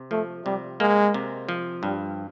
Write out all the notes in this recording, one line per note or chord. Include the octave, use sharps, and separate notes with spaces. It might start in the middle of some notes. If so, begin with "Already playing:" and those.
Already playing: C3
F3 A3
C3 G3
G#3 A#3
C3
F3
G2 G3